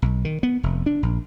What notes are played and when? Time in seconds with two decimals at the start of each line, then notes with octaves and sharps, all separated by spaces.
0.02 B1
0.25 D#3
0.43 B3
0.63 F1
0.86 D4
1.03 A#1